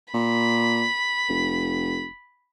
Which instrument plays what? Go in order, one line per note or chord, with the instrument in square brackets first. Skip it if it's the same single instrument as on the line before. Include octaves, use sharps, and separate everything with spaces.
[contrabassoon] A#2 [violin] B5
[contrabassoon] F1